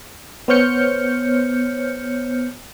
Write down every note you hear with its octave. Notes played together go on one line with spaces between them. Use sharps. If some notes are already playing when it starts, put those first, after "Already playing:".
B3 C5 C#5 F6 G6 C#7